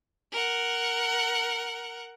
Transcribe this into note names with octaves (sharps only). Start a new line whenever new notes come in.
A#4 F#5